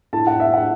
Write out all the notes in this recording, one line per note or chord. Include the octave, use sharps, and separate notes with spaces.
A2 A3 E4 A5
F#5
E5
F#5